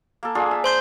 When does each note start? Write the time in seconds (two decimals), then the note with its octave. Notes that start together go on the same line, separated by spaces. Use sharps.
0.23 A#3 A4
0.35 D4 F4 G#4
0.51 E5
0.64 C5 C6 G6